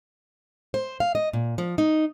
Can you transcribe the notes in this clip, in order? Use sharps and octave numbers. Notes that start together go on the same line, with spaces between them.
C5
F5
D#5
A#2
F3
D#4